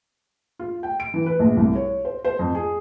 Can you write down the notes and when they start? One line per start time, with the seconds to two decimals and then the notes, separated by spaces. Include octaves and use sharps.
0.59 F4
0.83 G5
1.00 D7
1.14 E3
1.26 B4
1.39 A#1
1.57 C2
1.75 C#5
2.05 C5
2.25 C5
2.39 F2
2.55 G#4